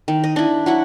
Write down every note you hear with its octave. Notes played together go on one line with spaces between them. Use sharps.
D#3
D#5
D4 E4
F#3 E4 F#4